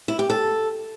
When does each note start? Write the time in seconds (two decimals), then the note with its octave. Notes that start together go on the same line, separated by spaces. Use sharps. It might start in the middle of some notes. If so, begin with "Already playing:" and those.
0.08 E4
0.19 G4
0.30 A4